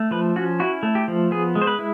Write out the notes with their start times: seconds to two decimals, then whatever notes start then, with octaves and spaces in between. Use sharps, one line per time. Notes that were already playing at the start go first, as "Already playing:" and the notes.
Already playing: A3
0.11 F3 B4
0.36 C#4 F#4
0.60 E4 F#4
0.83 A3
0.95 G4
1.08 F3
1.31 B3 G#4
1.55 G#3
1.62 C5
1.67 B4
1.79 E4